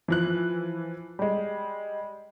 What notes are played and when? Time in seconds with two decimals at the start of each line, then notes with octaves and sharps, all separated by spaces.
0.08 E3 F3 F#6
1.19 G3 G#3